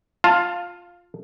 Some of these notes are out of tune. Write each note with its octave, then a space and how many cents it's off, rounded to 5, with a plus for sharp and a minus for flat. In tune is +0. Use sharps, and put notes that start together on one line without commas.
F4 +10 F5 +0 A5 +20